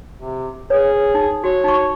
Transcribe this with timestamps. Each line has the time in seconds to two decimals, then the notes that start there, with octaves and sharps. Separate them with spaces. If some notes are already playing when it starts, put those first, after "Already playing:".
0.17 C3
0.70 G#4 B4 C#5
1.14 D#4
1.44 F#4 C#5
1.64 D#4 C#6